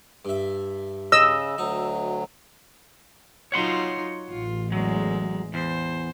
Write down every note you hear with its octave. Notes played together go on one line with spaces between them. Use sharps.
G2 E5
C#3 D#5 E6
D2 F#3 D#4
F#3 D#4 F4 C#5 F#5 C6
A1 F4
E2 F#3 G#3
E2 C5